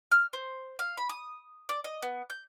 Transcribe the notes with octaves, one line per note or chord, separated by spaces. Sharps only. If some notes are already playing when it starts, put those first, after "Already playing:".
F6
C5
F5
B5
D#6
D5
D#5
B3
G6